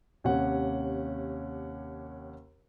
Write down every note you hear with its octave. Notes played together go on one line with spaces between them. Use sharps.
D#2 C3 C#4 F#5